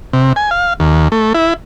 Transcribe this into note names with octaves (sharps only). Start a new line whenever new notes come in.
C3
G#5
F5
D#2
A3
E4